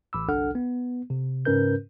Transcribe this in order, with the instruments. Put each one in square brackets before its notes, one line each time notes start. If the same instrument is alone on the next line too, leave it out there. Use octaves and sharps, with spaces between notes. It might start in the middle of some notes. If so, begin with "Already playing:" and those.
[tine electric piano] A1 B5 D6 E6
G1 C2 D4 A4 F#5 F6
B3
C3
G#2 C#3 C#4 A#4 B4 G6